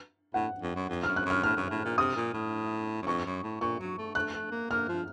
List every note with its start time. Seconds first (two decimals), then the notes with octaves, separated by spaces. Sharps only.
0.34 A2 F#5
0.62 F2
0.75 F#2
0.89 F2
1.03 F6
1.07 F#2
1.16 F#6
1.25 F#2
1.30 F6
1.43 A2 F6
1.57 F#2
1.70 A2
1.85 A#2
1.98 C3 D#6
2.16 A#2
2.34 A2
3.02 F#2
3.06 F2 C#6
3.25 F#2
3.43 A2
3.61 A#2 C#6
3.80 F#3
3.98 A3
4.15 A3 F#6
4.34 A3
4.51 A#3
4.70 A#3 F6
4.88 F3